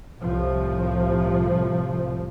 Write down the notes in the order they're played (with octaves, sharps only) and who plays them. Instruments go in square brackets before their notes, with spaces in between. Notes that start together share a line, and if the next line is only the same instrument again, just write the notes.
[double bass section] C2 A2 C3 F3